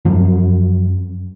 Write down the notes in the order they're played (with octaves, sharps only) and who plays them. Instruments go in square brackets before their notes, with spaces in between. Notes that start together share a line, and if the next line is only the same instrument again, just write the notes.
[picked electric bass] F#2 F3 F#3